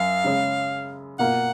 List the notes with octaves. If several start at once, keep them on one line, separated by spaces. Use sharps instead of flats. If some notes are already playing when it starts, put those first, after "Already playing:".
Already playing: F#2 F5
C#3 G#3 C#4 G#4
B2 A#3 F4 F#5